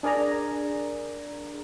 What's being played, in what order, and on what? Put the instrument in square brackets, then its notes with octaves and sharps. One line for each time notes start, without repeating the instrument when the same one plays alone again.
[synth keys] D4 G#4 A#4 D5 G#5 A#5